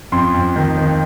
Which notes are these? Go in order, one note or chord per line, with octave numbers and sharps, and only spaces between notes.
F2 C6
F2
D#3
D#3